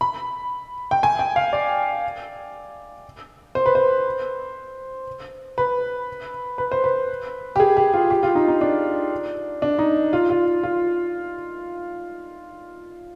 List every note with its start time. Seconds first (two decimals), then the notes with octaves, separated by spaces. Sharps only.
0.01 B5
0.91 G5
1.03 G#5
1.19 G5
1.36 F5
1.53 D5
3.55 C5
3.66 B4
3.75 C5
5.58 B4
6.58 B4
6.72 C5
6.84 B4
7.56 G4
7.60 G#4
7.77 G4
7.94 F4
8.10 G4
8.23 F4
8.35 D#4
8.48 D#4
8.61 D4
9.62 D4
9.79 D#4
10.13 F4
10.30 F4
10.63 F4